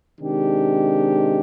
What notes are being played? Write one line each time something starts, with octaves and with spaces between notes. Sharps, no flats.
C3 D#3 G#3 D4 G4